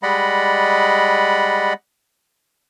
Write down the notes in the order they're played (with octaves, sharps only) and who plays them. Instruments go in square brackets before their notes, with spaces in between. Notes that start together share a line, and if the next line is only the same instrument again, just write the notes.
[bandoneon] G3 G#3 D5 D#5 F#5 B5